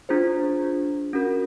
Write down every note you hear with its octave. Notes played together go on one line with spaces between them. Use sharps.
D4 F4 G#4 C5
C#4 F#4 A#4